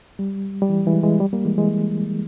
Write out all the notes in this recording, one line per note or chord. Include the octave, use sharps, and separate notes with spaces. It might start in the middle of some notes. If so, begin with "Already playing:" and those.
G3
G3
E3
E3 G#3
E3 G#3
G3
G3 A#3
E3 G#3
E3 G#3